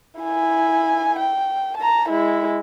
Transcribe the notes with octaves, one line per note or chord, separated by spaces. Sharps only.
E4 G#5
G5
A5 A#5
G#3 E4